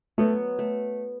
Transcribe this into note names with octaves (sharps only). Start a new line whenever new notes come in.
F#3 A3 B3 F#4
A3